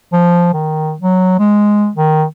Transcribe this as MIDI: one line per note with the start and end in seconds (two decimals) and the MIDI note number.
0.13 0.50 53
0.53 0.93 51
1.01 1.36 54
1.39 1.89 56
1.96 2.24 51